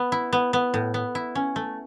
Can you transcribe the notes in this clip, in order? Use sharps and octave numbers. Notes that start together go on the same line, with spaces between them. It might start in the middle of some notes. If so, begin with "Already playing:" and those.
Already playing: B3
E4
B3
B3
A2
B3
E4
C#4
A3